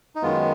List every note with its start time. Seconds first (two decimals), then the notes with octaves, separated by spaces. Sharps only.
0.16 D#4
0.22 F#2 D#3 G#3 B3 F4